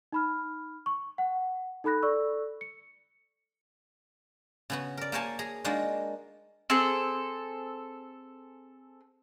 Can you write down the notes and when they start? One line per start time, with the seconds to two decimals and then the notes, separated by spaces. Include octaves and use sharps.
0.12 D#4 B5 F6
0.86 C#6
1.18 F#5
1.84 D#4 A4 B5 F#6 A#6
2.02 A4 D5 C#6 E6
2.61 C#7
4.70 C#3 B3 F#4
4.97 A#4 D5
5.12 A#3 A#4 C5 C#5 G#5 A5
5.39 G#4 A#5
5.64 G#3 A#3 D4 D#4 F4 F#4
6.70 C4 G#4 A4